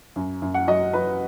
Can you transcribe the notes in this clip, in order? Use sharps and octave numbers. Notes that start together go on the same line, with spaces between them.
F#2
F#2
F#5
F#3 D#5
F#3 B4